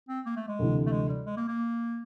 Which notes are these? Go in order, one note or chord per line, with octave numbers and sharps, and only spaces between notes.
C4
A#3
A3
G#3
D2 C3 E3
A3
G#3
G3
G#3
A#3
A#3